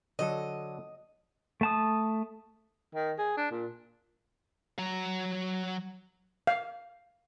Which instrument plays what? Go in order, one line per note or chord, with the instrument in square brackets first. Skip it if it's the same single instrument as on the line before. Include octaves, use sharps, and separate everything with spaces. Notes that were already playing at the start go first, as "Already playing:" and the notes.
[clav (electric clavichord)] D3 F#3 A4 [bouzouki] D#5
[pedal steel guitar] A3 A5 D#6
[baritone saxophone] D#3
G#4
D4
A#2
[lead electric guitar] F#3 A#5
[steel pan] F5